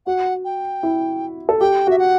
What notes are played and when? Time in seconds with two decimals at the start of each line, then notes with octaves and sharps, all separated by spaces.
0.06 F#4 F#5
0.45 G5
0.83 E4
1.49 A4
1.60 G4 G5
1.87 F#4 E5
1.99 F#5